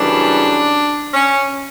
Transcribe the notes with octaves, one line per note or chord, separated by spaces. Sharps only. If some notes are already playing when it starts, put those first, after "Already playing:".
Already playing: F#2 C#3 E3 G3 D4
C#4